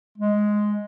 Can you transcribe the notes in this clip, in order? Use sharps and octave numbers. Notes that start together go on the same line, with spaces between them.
G#3